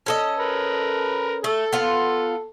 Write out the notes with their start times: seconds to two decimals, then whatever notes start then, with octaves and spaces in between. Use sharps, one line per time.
0.06 C#4 A4 D#5
0.40 A#4 B4
1.44 A3 A4
1.73 B3 F4